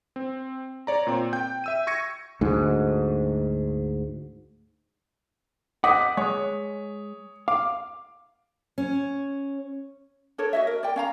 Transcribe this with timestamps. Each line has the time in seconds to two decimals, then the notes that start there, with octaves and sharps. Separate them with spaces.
0.16 C4
0.87 C#5 D5 A#5
1.07 A#2 C4
1.33 G5 G6
1.64 E5 E6 D#7
1.87 C#6 G#6 A#6 C#7
2.41 D2 G#2
5.84 C5 D#5 F#5 D6 D#6 B6
6.17 G#3 C#5 D#6
7.48 F5 D6
8.78 C#4
10.38 D4 A4 A#4 C#5
10.53 F#4 D#5 E5
10.67 A#4
10.83 D5 G5
10.96 C#4 F5 A#5